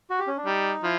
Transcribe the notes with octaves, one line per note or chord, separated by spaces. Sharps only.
F#4
G4
C#4
D4
G3 D#4
F3 E4